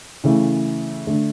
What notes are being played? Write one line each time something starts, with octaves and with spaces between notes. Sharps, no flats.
C#3 E3 A3
D3 A3